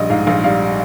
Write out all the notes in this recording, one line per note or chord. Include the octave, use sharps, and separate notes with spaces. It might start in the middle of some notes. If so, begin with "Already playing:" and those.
Already playing: A#1 G3 D#5
G#2 F5
A#1 F5
G3 F5